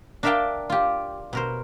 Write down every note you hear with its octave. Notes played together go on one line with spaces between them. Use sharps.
D4 A#4 E5 F5 G5 A5
F4 G4
B2 A#4 C5